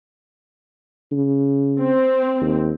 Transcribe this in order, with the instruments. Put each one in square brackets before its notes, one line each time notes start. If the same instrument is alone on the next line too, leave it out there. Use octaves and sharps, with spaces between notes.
[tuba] C#3
[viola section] C4
[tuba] D#2